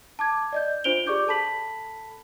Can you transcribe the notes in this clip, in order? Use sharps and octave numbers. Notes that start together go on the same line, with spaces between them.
A5 D6 G#6
D5 D#5 G6
D4 F4 C5 D7 F7 G7
G4 G#4 D5 C#6 D6 G6
A4 A5 B5 B6 F#7